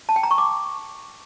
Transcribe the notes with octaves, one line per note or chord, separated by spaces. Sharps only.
A5
G5
A#5
C#6
D6